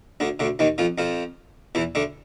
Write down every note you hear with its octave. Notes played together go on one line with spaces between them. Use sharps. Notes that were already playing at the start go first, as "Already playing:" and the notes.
D2 D3
D2 D3
D#2 D#3
F2 F3
F2 F3
E2 E3
D2 D3